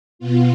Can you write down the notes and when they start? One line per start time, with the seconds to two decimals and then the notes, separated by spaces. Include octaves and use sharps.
0.19 B2 B3 F4